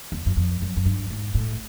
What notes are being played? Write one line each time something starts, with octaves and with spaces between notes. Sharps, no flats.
E2
F#2
F2
F#2
F#2
G2
G#2
A2